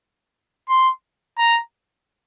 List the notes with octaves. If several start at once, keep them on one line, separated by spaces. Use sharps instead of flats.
C6
A#5